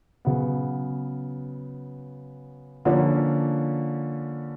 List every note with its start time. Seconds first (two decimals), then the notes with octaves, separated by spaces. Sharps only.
0.25 C#3 F#3 B3
2.85 D3 F3 A#3 C#4